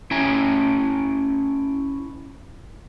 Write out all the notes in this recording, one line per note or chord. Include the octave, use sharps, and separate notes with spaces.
C#4 E4 E5 G5 G#5 A#5